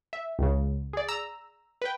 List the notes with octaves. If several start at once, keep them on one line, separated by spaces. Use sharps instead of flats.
E5
C#2 C#3
G#4 D5
A#5 E6
B4 G5